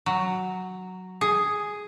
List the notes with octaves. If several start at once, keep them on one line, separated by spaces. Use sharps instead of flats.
F#3
G#4